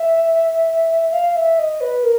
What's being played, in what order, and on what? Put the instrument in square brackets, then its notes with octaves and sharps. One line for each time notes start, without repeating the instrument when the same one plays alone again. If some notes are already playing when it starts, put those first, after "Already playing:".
Already playing: [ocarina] E5
F5
E5
D#5
B4
A#4